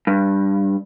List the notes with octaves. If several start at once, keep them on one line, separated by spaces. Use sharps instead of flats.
G2